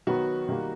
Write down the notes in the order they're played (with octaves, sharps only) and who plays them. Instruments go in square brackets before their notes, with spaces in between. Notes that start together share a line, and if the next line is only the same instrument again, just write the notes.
[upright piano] D#3 F#3 B3 F#4
D#3 G3 A#3